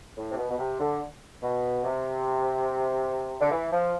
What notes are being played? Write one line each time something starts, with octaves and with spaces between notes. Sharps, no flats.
A2
C3
B2
B2
C3
D3
B2
C3
D3
E3
F3